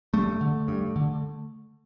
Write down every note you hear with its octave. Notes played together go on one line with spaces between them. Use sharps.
G2 A3
D3
G2
D3